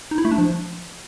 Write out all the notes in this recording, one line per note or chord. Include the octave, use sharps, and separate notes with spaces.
D#4
E4
A3
D4
F3